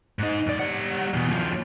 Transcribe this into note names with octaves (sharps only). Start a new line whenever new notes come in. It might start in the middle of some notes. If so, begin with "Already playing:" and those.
G#2 D#4
F#2 D5
G3 F#5
E2 B2
D#2 F3